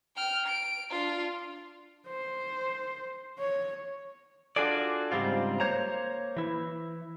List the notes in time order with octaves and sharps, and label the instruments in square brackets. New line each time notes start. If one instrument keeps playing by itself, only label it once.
[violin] G5 F6
D7
D4 F4
[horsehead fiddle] C5
C#5
[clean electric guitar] D4 F4 F#4 G#4 A4 D5
G#2 C#3 G3 C4 F4
A#3 C5 C#5 A#5
E3 E4